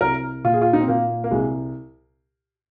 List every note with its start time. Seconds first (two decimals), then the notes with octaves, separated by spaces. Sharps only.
0.01 C2 A#4
0.44 A#2 F4
0.54 G#4
0.62 F4
0.73 D#4
0.80 C4
0.88 A#2 A#3
1.24 A#3
1.31 C2 G#3